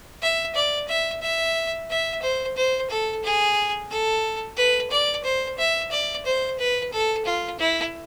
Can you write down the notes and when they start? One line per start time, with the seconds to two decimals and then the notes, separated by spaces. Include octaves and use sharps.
0.22 E5
0.55 D5
0.88 E5
1.22 E5
1.90 E5
2.22 C5
2.56 C5
2.90 A4
3.24 G#4
3.90 A4
4.57 B4
4.91 D5
5.24 C5
5.58 E5
5.91 D5
6.26 C5
6.59 B4
6.92 A4
7.25 F4
7.59 E4